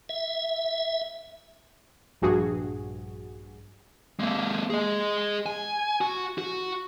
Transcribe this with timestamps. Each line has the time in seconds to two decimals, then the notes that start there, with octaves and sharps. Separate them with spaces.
0.09 E5
2.22 A#1 G2 F#4 G#4
4.19 G#3 A#3
4.70 G#4 D#5
5.46 G#5
6.01 F#4
6.38 F#4